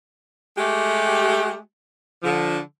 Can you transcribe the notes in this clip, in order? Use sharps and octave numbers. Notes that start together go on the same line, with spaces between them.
G#3 A3 G4
D3 F3